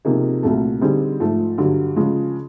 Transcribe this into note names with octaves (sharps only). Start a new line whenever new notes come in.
C3 F3 A#3 D#4 G#4
C2 A#2 F#3 A3
D3 G3 C4 D#4 G#4
G#2 F3 A3
G2 D3 F#3
C#3 F3 G#3